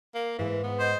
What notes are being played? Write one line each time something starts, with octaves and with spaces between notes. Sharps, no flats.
A#3
G#2 E3 G#3
B3
C5 D#5